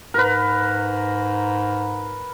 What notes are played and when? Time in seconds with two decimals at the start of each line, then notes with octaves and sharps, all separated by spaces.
0.14 G#2 A#4 B4